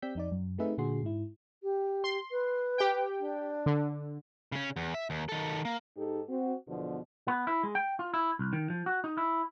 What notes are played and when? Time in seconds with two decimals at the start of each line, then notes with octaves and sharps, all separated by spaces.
0.02 C4 G4 D5 E6 G6 B6
0.15 F2 D#4 D5
0.32 F#2
0.58 A3 C4 D#4 G#4 B4 E5
0.78 A#2 D3 F#4 G#4 C6
1.02 G#2 E4
1.63 G4
2.04 C6
2.31 B4
2.78 G4 G5
3.20 D4
3.66 D3
4.52 C#3 C#4
4.76 E2
4.94 E5
5.10 D#2
5.29 D#3 A4
5.65 A#3
5.97 G#2 D#4 G4 A4
6.28 C4 F#4
6.68 E2 B2 D3 F3
7.28 B3
7.47 E4
7.63 G#3
7.75 G5
7.99 F4
8.14 E4
8.39 C2
8.53 D#3
8.70 F3
8.86 F#4
9.04 D#4
9.18 E4